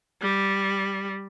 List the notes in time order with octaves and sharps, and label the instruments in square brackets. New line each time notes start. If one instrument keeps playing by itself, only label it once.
[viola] G3